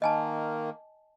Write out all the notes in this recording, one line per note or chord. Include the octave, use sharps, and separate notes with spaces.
D#3 A#3 D#5 G#5 A5